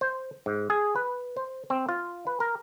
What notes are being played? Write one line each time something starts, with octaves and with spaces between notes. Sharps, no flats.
C5
G#2
G#4
B4
C5
C4
F4
B4
A#4